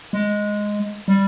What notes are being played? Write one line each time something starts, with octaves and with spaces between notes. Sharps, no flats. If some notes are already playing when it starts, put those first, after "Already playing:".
G#3
G3